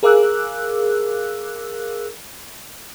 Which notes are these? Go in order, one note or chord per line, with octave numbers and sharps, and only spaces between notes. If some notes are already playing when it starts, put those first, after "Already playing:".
G#4 A#4 F5 D6 E6 F#6